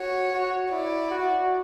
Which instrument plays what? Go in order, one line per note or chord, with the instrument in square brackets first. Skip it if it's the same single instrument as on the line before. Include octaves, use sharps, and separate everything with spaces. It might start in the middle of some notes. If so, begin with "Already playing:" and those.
Already playing: [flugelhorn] F#4 [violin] C#5
[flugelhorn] F#4
[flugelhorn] E4 [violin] D5
[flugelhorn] F#4